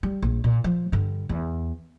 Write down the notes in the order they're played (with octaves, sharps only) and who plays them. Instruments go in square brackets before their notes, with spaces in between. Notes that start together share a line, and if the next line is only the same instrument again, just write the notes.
[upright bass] G3
A#1
A#2
F3
G2 D3
E2